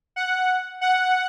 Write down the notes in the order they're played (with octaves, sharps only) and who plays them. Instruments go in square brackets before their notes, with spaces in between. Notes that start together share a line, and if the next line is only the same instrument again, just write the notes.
[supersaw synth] F#5
F#5